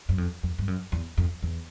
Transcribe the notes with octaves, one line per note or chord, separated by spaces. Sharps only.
F#2
F2
F2
G2
F#2
E2
F2
E2